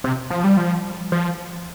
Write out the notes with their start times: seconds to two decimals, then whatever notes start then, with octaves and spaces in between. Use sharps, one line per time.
0.04 C3
0.30 F3
0.44 G3
0.57 F3
1.12 F3